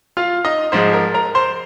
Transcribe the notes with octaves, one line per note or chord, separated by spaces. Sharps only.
F4 F5
D#4 D#5
G#2 F3 G#3 C5
A#4
A#4 A#5
C5 C6